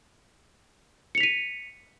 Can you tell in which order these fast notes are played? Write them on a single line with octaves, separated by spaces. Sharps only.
C#7 F7 B6 D#7